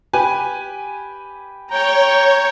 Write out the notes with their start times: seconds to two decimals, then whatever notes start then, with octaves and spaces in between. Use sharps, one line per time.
0.13 G4 B4 G#5
1.70 C#5 G5 A#5